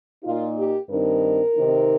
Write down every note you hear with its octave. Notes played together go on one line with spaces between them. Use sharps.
A#2 A#3 D#4 F4
G4
G2 D#3 C4 D#4 A#4
C3 D#3 C4 D#4